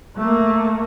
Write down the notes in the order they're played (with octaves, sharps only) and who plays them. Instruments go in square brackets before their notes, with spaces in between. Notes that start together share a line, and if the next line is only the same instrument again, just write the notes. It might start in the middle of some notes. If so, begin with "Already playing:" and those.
[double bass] A3 A#3